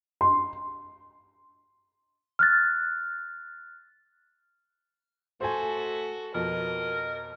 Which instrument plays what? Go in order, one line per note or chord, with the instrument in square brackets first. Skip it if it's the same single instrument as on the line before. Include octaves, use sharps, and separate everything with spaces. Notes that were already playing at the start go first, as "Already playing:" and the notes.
[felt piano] C6
[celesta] F6 F#6 A6
[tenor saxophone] A3 [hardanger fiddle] F#4 A4 [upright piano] C5 G#5
[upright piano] F2 B2 [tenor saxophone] A#4 [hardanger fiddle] D#5